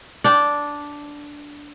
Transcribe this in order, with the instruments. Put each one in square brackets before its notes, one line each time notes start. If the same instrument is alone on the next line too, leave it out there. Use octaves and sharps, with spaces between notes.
[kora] D4 G5